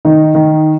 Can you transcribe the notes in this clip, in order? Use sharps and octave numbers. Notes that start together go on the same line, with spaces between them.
D#3 D#4
D#3